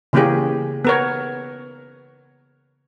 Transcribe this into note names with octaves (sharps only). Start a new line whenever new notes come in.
C#3 E3 A#3 C#4 G4 G#4
B3 A#4 C#5